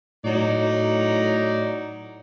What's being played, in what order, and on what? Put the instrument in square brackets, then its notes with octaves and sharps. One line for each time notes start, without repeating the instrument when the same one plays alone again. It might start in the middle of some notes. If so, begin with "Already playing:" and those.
[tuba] A2 [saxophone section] F#3 D#4 D5